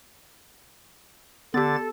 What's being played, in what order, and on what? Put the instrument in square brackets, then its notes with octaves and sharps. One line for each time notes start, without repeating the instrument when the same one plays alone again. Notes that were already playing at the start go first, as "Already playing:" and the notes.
[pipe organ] D3 A6 [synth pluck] B3 G4 [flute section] A4